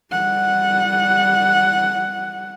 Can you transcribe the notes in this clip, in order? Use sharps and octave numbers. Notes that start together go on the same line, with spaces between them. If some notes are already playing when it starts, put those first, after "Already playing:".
G3 F#5